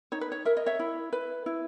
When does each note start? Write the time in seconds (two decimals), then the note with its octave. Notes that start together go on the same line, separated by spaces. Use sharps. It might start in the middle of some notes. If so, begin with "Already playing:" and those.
0.12 D#4 C#5
0.21 B4
0.32 C#5
0.45 A#4 E5
0.57 D#5
0.66 C#5 E5
0.79 E4
1.13 B4
1.46 E4